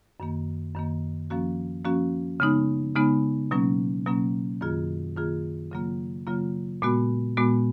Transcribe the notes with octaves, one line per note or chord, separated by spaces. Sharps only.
F#2 D#3 A#3
F#2 D#3 A#3
F3 A#3 C#4 F#4
F3 A#3 C#4 F#4
C#3 G#3 B3 D#4
C#3 G#3 B3 D#4
B2 F#3 A#3 C#4
B2 F#3 A#3 C#4
F#2 D#3 A#3 F4 G#4
F#2 D#3 A#3 F4 G#4
C#3 F#3 A#3 F4
C#3 F#3 A#3 F4
A#2 G#3 B3 F#4
A#2 G#3 B3 F#4